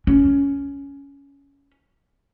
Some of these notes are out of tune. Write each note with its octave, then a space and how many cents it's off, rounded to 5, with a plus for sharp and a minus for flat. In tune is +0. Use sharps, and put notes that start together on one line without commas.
C#4 +15